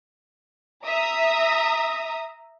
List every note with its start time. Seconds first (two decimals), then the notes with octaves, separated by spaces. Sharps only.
0.85 E5 A#5 D#6